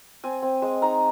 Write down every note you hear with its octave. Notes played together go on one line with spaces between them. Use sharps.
C4 G#5
C4
G#3
D#4 A#5